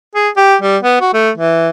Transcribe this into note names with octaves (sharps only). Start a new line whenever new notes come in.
G#4
G4
G3
B3
F#4
A3
E3